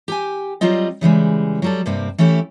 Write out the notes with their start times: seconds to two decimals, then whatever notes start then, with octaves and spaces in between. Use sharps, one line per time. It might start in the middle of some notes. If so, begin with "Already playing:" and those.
0.08 G4 G5 G#5
0.61 F#3 G3 C4 F4 D#5
1.01 C#3 E3 G3 G#3
1.62 F#3 G3 A4
1.86 G2 C3 A#3 C4
2.18 E3 A3 C#4 E4 G4